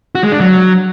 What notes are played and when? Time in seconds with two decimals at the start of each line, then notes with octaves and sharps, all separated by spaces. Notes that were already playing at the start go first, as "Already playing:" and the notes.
0.15 F#4
0.24 G#3
0.32 D4
0.40 F#3